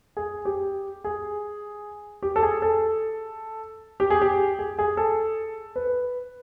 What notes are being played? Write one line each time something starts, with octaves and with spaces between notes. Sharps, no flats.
G#4
G4
G#4
G4
A4
G#4
A4
G4
G#4
G4
G#4
G#4
A4
B4